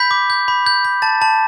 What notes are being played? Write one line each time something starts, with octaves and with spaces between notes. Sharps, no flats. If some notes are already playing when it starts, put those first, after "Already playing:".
Already playing: B5 G6 B6
D6
G6
B5
G6
G6
A5 A6
A5